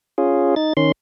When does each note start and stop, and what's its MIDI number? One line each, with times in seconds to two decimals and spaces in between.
0.18 0.55 61
0.18 0.55 65
0.18 0.55 68
0.56 0.73 63
0.56 0.73 93
0.77 0.92 51
0.77 0.92 61
0.77 0.92 84